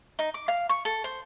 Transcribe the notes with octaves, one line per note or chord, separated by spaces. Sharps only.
D#4
D6
F5
C#6
A4
C5